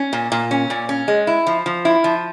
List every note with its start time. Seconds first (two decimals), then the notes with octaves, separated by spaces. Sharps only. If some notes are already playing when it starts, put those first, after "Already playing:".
Already playing: C#4
0.13 A#2
0.32 A#2
0.51 C#4
0.70 A#2
0.89 C#4
1.08 G#3
1.27 E4
1.47 F3
1.66 F3
1.85 E4
2.04 F3